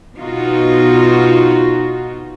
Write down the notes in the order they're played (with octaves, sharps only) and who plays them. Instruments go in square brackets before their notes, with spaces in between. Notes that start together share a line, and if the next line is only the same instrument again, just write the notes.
[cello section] B2 D#4 F4 F#4